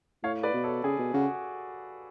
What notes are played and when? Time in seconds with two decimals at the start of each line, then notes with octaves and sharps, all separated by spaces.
0.23 A2 C#5 F5
0.43 B4 D5
0.54 B2
0.64 A4 C#5
0.84 C#3 G#4
0.99 B2
1.14 C#3 F#4